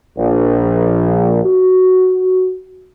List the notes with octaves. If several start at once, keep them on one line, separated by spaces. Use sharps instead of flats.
A#1
F#4